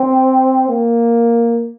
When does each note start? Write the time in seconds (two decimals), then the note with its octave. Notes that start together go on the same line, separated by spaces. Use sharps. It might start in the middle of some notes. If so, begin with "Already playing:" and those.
Already playing: C4
0.69 A#3